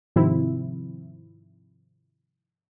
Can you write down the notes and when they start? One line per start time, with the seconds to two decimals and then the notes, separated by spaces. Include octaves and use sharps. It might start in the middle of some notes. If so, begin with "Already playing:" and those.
0.16 G#2 C3 D#3 F3 C4 E4